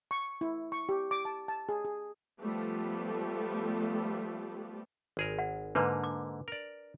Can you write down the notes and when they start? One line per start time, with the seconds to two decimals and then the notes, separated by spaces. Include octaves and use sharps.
0.11 C#6
0.41 E4
0.72 C#6
0.89 G4
1.11 D6
1.25 A5
1.48 A5
1.69 G#4
1.85 G#4
2.41 F3 G3 A3 B3 G4 A4
5.17 G#1 G#4 A#4
5.39 F#5
5.75 G#2 D3 A#3 D4 B4 A5
6.04 D6
6.48 A#4 D5